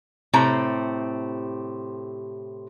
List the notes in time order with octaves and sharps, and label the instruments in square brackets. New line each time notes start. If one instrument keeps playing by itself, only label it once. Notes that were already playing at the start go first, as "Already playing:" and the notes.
[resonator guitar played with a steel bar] A2 C3 C4 A#5